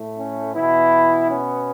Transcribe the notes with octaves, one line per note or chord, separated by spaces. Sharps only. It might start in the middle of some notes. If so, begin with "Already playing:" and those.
Already playing: A2 A3
C#4
B2 E3 B3 E4
C#4